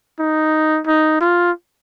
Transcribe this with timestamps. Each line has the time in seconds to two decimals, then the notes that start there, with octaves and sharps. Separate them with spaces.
0.19 D#4
0.87 D#4
1.21 F4